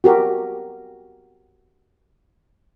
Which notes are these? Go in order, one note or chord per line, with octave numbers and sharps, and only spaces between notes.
F#4 G4 A#4